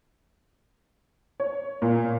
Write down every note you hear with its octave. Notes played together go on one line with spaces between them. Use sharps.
C#5
A#2